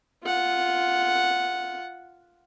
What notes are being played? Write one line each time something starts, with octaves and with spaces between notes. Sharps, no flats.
F4 F#5